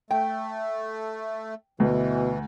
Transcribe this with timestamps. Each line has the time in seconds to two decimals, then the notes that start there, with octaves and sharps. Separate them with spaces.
0.11 A3 G5
1.80 D2 B2 E3